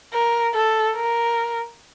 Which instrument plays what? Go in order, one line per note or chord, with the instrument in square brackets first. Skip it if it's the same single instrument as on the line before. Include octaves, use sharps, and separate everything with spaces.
[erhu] A#4
A4
A#4